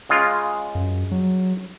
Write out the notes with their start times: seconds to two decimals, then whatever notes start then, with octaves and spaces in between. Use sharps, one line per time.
0.09 C#3 G#3 F4
0.75 F#2
1.12 F#3